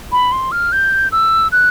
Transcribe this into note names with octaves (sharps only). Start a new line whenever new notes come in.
B5
C6
F6
G6
E6
F#6